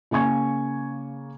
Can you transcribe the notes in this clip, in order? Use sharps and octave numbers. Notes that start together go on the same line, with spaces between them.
C#3 A#3 G#5 C#6 G#6